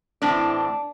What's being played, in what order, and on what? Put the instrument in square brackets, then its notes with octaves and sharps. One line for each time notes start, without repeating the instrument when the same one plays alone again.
[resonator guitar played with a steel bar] A2 E3 C4 D4